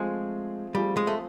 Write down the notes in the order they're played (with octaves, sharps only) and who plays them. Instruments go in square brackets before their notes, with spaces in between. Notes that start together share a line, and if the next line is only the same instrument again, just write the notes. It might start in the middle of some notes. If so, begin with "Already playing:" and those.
Already playing: [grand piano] F3 A3 C4 F4 G#4 [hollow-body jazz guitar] G#3
[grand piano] F3 A3 C4 F4 G#4 [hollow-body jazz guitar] G3
[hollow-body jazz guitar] G#3
A3